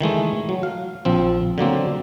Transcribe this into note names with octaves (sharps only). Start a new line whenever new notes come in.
D#3 E3 G#3 A3
F#3
F5
A#1 F3 C4
D3 F#3 A#3 C4